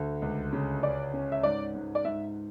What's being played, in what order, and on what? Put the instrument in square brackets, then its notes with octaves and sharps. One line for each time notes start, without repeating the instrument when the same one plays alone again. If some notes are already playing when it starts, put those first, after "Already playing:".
Already playing: [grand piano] D2 D3
C#2
C#3
[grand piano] C#4 [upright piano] D5
[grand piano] C#4
[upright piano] E5
[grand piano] G#2 [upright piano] D5
[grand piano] G#2
[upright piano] D5
[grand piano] G#2 [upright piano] E5